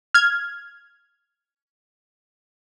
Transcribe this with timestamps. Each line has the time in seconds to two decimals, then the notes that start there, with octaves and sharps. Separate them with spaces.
0.14 F6 G#6